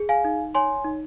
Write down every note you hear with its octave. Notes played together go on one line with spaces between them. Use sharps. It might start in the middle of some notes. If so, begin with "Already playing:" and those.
Already playing: G#4
F5 G#5
D#4
C#5 G#5 C6
D#4